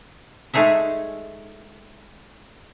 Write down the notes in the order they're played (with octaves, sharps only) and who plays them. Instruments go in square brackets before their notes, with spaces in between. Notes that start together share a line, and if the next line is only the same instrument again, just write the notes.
[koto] G#3 A3 D#4 G#4 E5